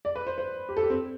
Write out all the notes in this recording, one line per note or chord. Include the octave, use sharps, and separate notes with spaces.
D5
B4
C5
C5
G4
A4
G4
C4